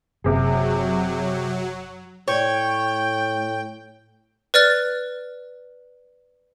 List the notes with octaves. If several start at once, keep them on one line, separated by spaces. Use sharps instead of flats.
F#1 C3 F#3 G#4
A2 C#5 G5
B4 D5 F6 A6